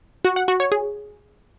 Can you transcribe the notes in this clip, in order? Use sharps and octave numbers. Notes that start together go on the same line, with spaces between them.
F#4
F#5
F#4
C#5
G#4